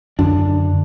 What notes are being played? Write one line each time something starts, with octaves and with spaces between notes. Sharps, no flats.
F#2 D3 D4